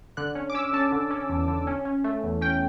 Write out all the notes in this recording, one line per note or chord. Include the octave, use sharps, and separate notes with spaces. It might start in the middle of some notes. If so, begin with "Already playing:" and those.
D3 F#6
C#4
D6
C#4 E6
C#4 A5
D3
C#4
E2
D3
C#4
C#4
A3
E2
C#4 G5